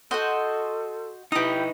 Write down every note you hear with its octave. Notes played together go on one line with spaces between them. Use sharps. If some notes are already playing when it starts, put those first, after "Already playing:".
F#4 A4 C5 D#5 F#5
D#4 E4 G4 B4 D#6